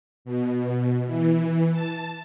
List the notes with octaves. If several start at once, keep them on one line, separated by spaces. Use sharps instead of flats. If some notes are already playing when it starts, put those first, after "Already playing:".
B2
E3
A5